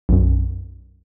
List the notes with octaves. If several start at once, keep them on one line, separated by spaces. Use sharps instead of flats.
B1 F#2